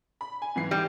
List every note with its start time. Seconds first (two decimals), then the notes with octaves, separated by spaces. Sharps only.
0.21 B5
0.42 G#5
0.56 G#2 E3 C7
0.71 G3